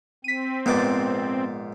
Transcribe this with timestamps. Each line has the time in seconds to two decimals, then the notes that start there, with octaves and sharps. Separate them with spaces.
0.24 C4 B6 D#7
0.66 A#1 G#2 B3 B4 D6 A6